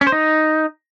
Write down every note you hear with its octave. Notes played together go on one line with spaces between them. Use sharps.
C#4
C5
D#4